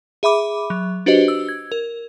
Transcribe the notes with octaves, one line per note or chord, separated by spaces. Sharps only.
G#4 E5 B5 D6
F#3
D4 F#4 G4 B4 C5 D#5
E6
G#6
A#4